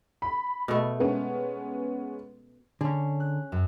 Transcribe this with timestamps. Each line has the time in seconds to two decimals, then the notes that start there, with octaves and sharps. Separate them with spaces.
0.22 B5
0.68 B2 A3
0.99 G#3 B3 C#4
2.81 D3 C#4 G#4
3.20 F#6
3.52 F#2